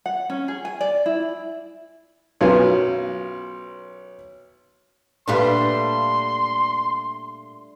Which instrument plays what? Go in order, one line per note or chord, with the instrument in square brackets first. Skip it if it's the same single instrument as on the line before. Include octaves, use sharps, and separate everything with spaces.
[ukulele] F#5
C#4
G#4
G#5
D5
E4
[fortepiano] B1 F#2 B3 F4 G#5
[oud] A#2 B4 F5 [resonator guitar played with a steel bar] G3 A3 D4 [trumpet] C6